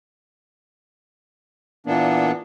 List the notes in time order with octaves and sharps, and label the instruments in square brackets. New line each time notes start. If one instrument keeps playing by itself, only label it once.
[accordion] A#2 E3 A#3 B3 D4